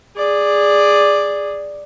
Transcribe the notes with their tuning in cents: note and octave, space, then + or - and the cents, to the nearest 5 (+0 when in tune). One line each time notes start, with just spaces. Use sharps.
G#4 -10 D5 +0